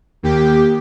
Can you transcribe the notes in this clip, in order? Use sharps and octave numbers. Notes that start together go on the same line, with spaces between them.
D#2 G4